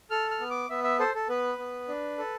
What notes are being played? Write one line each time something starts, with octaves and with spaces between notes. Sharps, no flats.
A4 F6
F6
B3
D6
B3 E5
E5
A4 C5
A4
B3 B4
B3
D4
A4